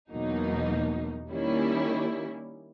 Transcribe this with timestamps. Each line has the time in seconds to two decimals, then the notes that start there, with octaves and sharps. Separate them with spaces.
0.11 E2 B2 F#3 A#3 D#4
1.29 D#3 G3 A#3 C#4 E4